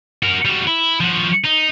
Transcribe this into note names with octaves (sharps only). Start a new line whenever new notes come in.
F#4 A#4
G3 F#4
E4
F3 F#4
D#4